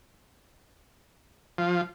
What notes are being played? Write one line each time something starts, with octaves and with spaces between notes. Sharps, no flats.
F3